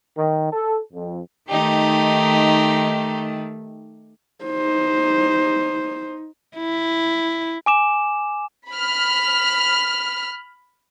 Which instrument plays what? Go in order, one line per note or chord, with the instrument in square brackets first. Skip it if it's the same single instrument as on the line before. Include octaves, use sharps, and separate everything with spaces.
[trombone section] D#3
A4
F2
[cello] D#3 A3 [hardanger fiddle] D#4 G4
[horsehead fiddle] D#4 C5
[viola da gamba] E4
[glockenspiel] G#5 D6 E7
[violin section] B5 F6